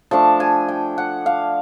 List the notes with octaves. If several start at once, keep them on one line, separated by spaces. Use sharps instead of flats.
F3 A3 D4 A5
G#5
G5
F#5
F5